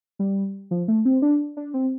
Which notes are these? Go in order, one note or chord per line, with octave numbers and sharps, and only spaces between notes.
G3
F3
A3
C4
D4
D4
C4